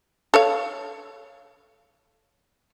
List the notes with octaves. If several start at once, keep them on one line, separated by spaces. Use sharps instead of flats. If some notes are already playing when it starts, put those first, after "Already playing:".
A4 C#5 F5